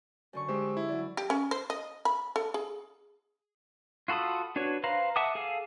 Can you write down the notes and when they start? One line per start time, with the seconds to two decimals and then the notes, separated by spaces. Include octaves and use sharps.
0.33 F#2 D3 C#6
0.49 G#3 G4 C5 E6
0.77 E4
0.88 F#3 D5
1.17 G4
1.30 C#4
1.51 C5
1.70 D#5
2.05 B5
2.36 A4
2.54 G#4
4.08 F4 F#4 A4 B5 D#6
4.56 D4 F#4 B4 C#5
4.84 B4 C5 F5 A#5
5.16 E5 F#5 A5 D6 D#6
5.35 G#4 A4 F5